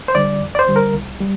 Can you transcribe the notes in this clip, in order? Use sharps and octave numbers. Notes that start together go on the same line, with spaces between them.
C5
D3 G3 D5
F2
D5
C5
D3 G3
A#4
C2
G3